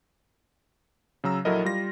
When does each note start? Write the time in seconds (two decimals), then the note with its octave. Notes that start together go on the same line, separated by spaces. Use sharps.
1.24 C#3 F#3 A#5 E6
1.45 A#1 F#3 E4 A4 A#4 D#5
1.65 G3 F4 A#6